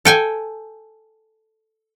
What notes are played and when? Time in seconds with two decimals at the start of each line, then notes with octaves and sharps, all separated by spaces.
0.05 A4 G5 G#5